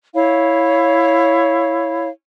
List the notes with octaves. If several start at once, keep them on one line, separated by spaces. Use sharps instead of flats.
E4 C#5 F5